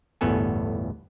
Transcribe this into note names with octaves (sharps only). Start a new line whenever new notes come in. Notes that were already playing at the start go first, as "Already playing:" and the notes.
G1 E2 A2 B3 A4 G#5